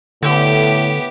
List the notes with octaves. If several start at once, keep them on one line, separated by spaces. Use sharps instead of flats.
A2 D3 B3 G4